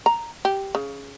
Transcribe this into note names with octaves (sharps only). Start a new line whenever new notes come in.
A#5
G4
C#3